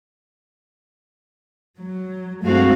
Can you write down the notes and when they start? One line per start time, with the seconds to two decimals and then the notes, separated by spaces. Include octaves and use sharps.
1.77 F#3
2.43 G2 G#3 A3 C4 F#4 F5